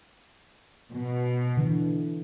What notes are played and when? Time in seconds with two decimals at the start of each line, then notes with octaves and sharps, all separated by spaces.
0.90 B2
1.57 D3 E3